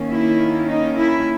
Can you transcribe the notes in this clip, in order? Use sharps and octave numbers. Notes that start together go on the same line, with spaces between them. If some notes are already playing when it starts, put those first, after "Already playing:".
Already playing: D#3 A#3 C#4
E4
D#4
E4